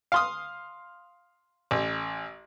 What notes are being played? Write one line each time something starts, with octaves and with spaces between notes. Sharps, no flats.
F5 C6 D#6
A1